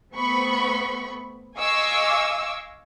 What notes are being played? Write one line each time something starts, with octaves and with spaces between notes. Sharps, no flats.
A3 B3 C4 B5 C#6
D#5 F5 G#5 C#6 D6 E6